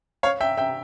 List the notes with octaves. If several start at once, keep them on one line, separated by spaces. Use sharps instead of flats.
C#5 F5
E5 G5
E5 G5